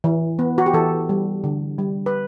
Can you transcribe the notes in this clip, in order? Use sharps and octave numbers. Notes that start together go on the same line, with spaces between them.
E3
B3
F#4
G4
E3 A4
G3
D3
G3
B4